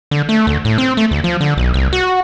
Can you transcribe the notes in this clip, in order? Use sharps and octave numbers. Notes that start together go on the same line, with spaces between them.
D3
A3
D2
A2
C4
A3
D2
F3
D3
B1
C2
F#4